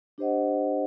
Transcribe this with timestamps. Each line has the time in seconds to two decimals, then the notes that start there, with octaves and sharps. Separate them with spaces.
0.18 D4 G4 C5 D#5 F#5